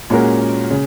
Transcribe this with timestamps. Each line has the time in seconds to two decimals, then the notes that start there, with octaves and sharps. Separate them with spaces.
0.10 A#2 G#3 C#4 F#4 A#4
0.71 C#3